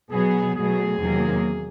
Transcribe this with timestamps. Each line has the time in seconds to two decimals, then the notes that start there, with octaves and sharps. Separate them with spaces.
0.11 B2 F#3 B3 G#4
0.54 B2 F#3 A3 G#4
0.98 E2 C3 D#3 F#3 A#3